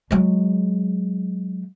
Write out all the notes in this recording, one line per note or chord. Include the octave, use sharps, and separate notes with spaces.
F#3 G#3